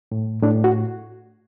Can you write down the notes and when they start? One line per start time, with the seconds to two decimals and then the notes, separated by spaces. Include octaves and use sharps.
0.12 A2
0.43 A2 D4
0.64 F#4